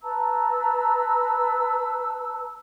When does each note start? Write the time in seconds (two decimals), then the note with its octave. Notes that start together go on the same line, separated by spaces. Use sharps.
0.02 B4 A5 A#5 E6